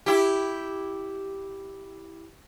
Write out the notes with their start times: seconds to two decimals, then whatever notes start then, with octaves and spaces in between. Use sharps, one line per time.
0.06 E4 G4